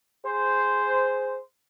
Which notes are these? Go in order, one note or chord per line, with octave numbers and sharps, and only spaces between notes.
G#4 C5